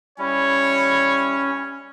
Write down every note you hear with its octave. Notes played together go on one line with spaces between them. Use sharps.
G3 C#4 E4 C#5